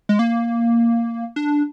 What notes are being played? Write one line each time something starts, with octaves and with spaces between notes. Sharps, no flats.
G#3
A#3
D4